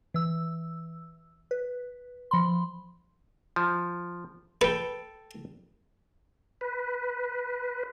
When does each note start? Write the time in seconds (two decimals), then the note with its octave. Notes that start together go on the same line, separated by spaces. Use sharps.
0.14 E3 E6
1.51 B4
2.31 F3 B5 C6
3.56 F3
4.61 A4 B4 G5
6.61 B4